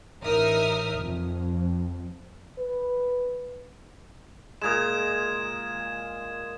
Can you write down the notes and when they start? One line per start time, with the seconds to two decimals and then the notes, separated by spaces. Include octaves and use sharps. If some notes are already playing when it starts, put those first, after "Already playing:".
0.23 A1 D#4 A#4 E5 D#6 F6
0.99 F2
2.58 B4
4.62 A#2 G#3 D#6 G#6 E7